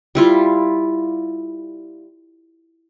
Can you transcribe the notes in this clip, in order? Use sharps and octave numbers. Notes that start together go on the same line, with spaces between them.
G3 E4 F4